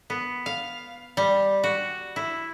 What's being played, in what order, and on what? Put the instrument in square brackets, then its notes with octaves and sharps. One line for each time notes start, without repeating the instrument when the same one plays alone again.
[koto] B3
F5
G3
F#4
E4